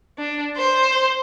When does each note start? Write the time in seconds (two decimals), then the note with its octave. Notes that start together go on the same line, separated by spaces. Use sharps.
0.18 D4
0.56 C5